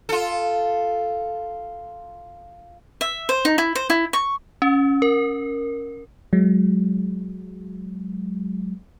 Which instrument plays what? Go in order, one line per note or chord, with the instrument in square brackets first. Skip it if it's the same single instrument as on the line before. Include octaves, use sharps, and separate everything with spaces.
[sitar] F4 A4
[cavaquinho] E5
C5
D#4
E4
C5
E4
C#6
[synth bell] C#4
A#4
[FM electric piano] F#3 G#3